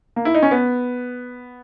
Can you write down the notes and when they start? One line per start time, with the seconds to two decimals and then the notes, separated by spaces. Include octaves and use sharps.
0.16 A#3
0.25 E4
0.34 D#4
0.43 C#4
0.51 B3